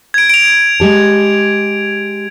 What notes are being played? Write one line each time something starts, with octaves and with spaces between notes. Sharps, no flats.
G#6 D7
D7 F7
G#3 G4 A5